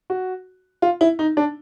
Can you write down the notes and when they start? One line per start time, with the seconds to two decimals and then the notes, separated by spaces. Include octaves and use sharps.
0.10 F#4
0.82 F4
1.01 E4
1.19 D#4
1.37 D4